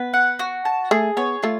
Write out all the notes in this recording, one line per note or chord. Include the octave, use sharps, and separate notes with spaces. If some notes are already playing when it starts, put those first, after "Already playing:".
Already playing: B3 B4
F#5
F#4
A5
A3 G#4
B3 C#5
A3 F4